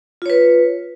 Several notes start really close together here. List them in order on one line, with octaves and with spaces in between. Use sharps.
F4 C#5 B4